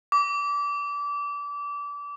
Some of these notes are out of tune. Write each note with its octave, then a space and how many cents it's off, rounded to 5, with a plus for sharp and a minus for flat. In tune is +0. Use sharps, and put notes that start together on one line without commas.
D6 -25